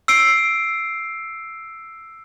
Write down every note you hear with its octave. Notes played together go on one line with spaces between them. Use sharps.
E6 C7 D7